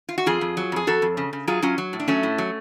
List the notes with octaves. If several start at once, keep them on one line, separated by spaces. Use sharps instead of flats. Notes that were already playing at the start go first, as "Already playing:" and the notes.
F4
F#4
F2 F4 G#4
F2
F#3
F2 G#4
F2 F#4 A4
F2
C#3
C#3
F#3 F4 G#4
F#3 C#4 F4
F#3
A2
D4
F#3 A3 C#4
A2
F#3